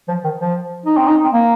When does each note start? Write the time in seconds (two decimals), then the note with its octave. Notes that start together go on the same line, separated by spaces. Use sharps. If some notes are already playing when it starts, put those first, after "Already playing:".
0.08 F3
0.24 D#3
0.40 F3
0.86 D#4
0.97 C4
1.08 D#4
1.24 C4
1.33 A#3